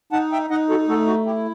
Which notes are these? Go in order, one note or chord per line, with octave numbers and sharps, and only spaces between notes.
D#4 F#5 A5
E5 G5
D#4 D#5 F#5
F#4 A4
A3 F#4 A4
F#4
E4 G4